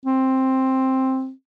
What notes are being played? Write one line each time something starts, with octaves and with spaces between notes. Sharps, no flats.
C4